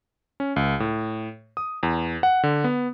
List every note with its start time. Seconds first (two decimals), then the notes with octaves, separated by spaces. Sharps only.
0.40 C#4
0.56 C#2
0.80 A2
1.57 D#6
1.83 E2
2.23 F#5
2.43 D3
2.64 B3